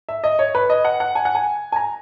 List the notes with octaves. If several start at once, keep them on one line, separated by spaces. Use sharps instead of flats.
E5
D#5
C#5
B4
D#5
F#5
F#5
G#5
F#5
G#5
G#5
A#5